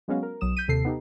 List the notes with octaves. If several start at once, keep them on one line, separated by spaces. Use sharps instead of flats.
F#3 G#3 B3 C#4 F#4 F5
A#4
B1 F#3 D#6 E7
G6 B6 D#7
D#2 C3 A4 C7
B3 D#4 G4 A4